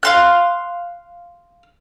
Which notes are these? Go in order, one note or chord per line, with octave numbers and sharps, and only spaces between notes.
F5 C6 F#6